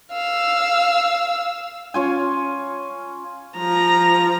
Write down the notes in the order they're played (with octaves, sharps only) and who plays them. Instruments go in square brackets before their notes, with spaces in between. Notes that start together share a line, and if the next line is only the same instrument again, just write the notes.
[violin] F5 E6
[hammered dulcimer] C#4 F4 G#5
[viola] F3 A#5